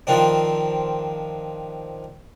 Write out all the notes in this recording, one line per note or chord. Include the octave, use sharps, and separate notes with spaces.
D#3 F3 C4 D4